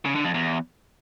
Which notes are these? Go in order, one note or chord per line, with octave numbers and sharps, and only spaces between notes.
C#3
D3
F2
E2